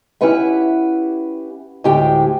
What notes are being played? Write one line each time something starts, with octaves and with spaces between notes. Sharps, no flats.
C#4 E4 G4 B4 E5 F#5
D2 A2 G#3 G4 G5